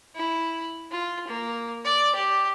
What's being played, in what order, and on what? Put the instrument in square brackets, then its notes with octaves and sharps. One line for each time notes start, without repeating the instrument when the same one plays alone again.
[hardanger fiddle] E4
F4
A#3
D5
G4